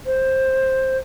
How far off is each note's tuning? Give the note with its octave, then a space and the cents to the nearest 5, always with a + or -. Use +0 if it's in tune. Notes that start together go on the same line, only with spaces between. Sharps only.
C5 +10